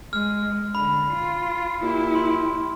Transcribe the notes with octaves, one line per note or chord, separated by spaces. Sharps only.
G#3 F6
D3 B5
F4
A#2 E4 G4
C6